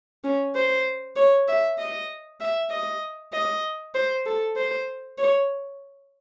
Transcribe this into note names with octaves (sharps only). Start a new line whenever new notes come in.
C#4
C5
C#5
E5
D#5
E5
D#5
D#5
C5
A4
C5
C#5